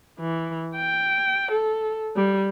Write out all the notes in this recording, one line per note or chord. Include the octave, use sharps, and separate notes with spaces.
E3
G5
A4
G3